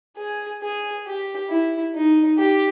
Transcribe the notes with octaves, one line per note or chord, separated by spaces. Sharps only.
G#4
G#4
G4
E4
D#4
G4